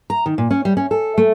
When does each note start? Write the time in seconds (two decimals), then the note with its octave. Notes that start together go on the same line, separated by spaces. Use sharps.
0.10 A#5
0.26 D#3
0.38 A#2
0.51 C#4
0.65 G3
0.77 C#4
0.91 A4
1.18 A3